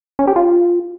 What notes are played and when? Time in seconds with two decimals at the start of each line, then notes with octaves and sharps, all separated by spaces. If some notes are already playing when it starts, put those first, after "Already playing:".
0.19 C#4
0.27 G4
0.36 F4